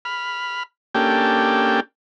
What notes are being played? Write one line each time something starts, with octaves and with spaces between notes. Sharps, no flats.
B5 F6
A#3 C#4 D4 G4 A4 G5